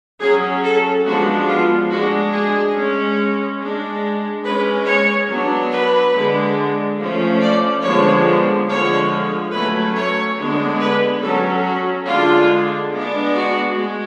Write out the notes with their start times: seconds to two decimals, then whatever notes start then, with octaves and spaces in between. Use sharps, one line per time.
0.20 F#3 C#4 G#4
0.63 A4
1.04 F3 G#3 B3 D4 F#4
1.47 F4
1.89 G#3 D4 F#4
2.32 G#4
2.75 G#3 C#4
3.60 G#3 D4
4.44 G#3 C#4 B4
4.86 C#5
5.28 F#3 B3 D4
5.71 B4
6.13 D3 G#3 D4
6.98 F3 A3 C#4
7.40 D5
7.82 D3 F3 G#3 B3 D4 C#5
8.67 D3 F3 G#3 C#5
9.51 F#3 A3 C#4 B4
9.95 C#5
10.37 D3 G#3 B3 D4
10.79 B4
11.21 F#3 C#4 A4
11.64 F#4
12.06 D3 G#3 D4 F4
12.91 G#3 B3 D4
13.34 F#4
13.75 G#3